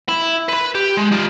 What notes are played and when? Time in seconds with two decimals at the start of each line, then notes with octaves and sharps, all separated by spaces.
0.09 E4
0.49 B4 B5
0.75 G4
0.97 G#3
1.12 D#4 F4